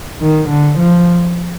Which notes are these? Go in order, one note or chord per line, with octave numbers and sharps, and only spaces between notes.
D#3
D3
F3